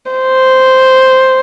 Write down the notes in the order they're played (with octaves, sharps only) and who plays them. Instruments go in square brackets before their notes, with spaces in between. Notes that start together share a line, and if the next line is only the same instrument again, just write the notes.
[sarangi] C5